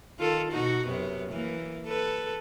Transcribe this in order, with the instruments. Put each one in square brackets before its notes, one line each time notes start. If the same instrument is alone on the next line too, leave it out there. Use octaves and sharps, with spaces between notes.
[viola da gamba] D#3 F4 A4
B2 D#4 F#4
F#2 C3 B3
E3 A#3
A4 B4